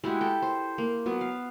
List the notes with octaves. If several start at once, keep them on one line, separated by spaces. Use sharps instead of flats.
G#3 E4 F#4 G4
A4 G5
C5
A#3
F#3 B3
F5